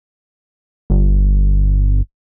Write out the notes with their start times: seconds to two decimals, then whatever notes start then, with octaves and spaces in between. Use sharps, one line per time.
0.90 G1